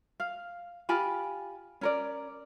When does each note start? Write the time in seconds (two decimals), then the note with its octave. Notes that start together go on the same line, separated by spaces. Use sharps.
0.20 F5
0.89 F4 G4 G#5 B5
1.81 C#4 A#4 D5